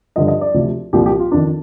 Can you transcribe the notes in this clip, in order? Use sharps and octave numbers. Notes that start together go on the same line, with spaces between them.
G2 D3 F3 D#5
D#5
D5
D2 C3 F3
C2 A#2 F3 G4
G4
F4
F2 D#3 D4